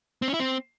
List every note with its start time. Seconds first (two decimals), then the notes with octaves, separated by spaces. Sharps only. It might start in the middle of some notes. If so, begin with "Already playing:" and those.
0.22 C4
0.28 C#4
0.34 E4
0.40 C4